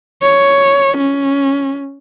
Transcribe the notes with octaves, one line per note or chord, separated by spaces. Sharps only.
C#5
C#4